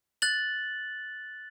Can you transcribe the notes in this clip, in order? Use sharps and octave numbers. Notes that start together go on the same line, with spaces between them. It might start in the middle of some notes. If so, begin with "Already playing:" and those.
F#6 A6 F#7